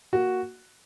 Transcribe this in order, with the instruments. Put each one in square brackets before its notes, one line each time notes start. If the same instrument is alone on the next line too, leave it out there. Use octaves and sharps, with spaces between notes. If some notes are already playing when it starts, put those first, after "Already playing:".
[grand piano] A#3 F#4